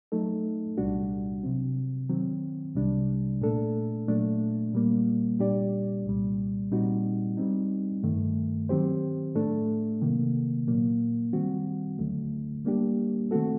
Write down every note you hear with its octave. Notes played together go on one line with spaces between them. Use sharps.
F#3 A3 D#4 A4
C2 A#2 G3 D4 F#4
C3 F#3 C4
D#3 F#3 C4
C2 C3 G3 D4
A#2 A3 D4 A4
A#2 F#3 A3 D4
A#2 G3 A#3
A#2 G3 D4 G4 D5
C2 A#2 G3
A#2 G3 C4 D#4 F#4
G3 C4 D#4
G2 D#3 A3
D#3 F#3 C4 G4 C5
A2 A3 D4 A4
C3 D#3 F#3 A#3
A#2 F#3 A#3
D#3 G3 C4 F#4
D2 D3 F#3 A3
G3 A#3 D4 G4
D#3 A3 C4 F#4 A4